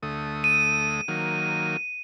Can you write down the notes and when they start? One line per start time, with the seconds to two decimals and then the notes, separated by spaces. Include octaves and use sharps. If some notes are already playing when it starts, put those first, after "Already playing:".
0.03 D2 A3 D#6
0.44 D#7
1.08 D#3 F#3 A#3